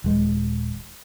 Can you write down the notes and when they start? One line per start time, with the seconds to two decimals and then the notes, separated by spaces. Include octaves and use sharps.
0.04 D#1 G#3